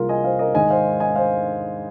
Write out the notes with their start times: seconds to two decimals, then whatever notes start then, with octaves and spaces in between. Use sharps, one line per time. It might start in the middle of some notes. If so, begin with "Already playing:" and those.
Already playing: C2 C3 F3 A#3 F4 G#4 A#4
0.09 D#5 G#5
0.24 C5 F5
0.39 A#4 D#5
0.54 G#2 D#3 G#3 D#5 G#5
0.70 C5 F5
1.00 D#5 G#5
1.15 C5 F5